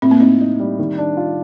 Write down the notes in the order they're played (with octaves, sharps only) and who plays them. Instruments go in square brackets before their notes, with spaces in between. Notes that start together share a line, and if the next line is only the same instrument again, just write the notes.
[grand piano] A2 [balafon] C4
[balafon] A#3
[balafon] C4 [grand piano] D#4
[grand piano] D#4
G3
D#3
D4
F4